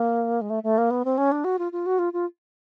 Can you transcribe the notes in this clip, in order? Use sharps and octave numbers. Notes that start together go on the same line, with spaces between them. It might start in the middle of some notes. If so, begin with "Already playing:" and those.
Already playing: A#3
G#3
A3
A3
A#3
B3
C4
C#4
D4
F#4
F4
F4
F#4
F4
F4